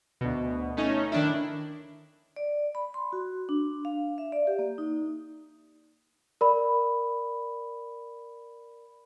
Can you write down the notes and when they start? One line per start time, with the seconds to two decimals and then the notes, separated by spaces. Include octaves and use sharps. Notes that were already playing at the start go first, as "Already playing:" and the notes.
0.21 D2 B2
0.77 A3 C#4 D#4
1.12 D#3 D4 E4
2.36 D5
2.75 B5
2.94 C6
3.13 F#4
3.49 D4
3.85 F5
4.18 E5
4.32 D5
4.47 G4
4.59 A#3
4.78 D#4
6.41 A#4 D5 B5